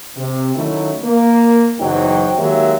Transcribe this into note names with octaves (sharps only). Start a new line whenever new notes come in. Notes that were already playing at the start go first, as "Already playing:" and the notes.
C3
D#3 F#3 A3 C#4 D#4 E4
A#3
F#1 E2 F#3 D#4 C5 G5
D#3 F#3 G#3 A#3 G4 E5